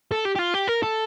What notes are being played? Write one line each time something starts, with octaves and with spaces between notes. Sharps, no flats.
A4
G4
G4
F4
G4
A#4
A4